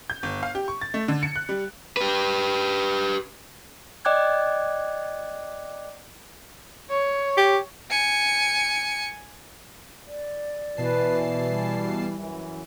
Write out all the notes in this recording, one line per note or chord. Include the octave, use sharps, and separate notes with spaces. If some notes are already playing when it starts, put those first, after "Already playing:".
G6
G1
F5
G4
C#6
A6
A3
D3
C#7
F#6
G3
G4 B4
D5 D#5 G5 D6 F#6 G#6
C#5
G4
G#5 C#7
D5
B2 E3 B4 A5 C7
G3
F#2 E3